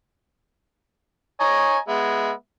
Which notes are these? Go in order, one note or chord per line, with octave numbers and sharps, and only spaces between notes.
C#5 D#5 G#5 A#5
G#3 B3 E5